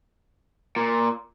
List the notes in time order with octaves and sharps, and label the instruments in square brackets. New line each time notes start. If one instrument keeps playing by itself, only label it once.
[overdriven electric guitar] A#2